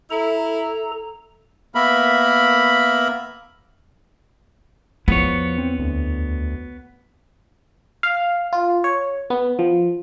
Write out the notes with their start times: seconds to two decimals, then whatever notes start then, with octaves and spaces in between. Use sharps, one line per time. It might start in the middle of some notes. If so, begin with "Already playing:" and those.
0.11 E4 A4 A#5
1.75 A#3 B3 A#4 E5 B5
5.08 E2 F3 B3 E4 C#5
5.58 C4
5.79 D2
8.03 F5
8.53 F4
8.84 C#5
9.30 B3
9.59 F3